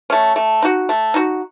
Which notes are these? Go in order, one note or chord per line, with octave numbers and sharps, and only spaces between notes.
A3 C#4
A3
D#4 F#4
A3
D#4 F#4